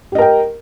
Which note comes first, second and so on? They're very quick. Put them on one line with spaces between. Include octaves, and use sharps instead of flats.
G4 D#5 A#4 G5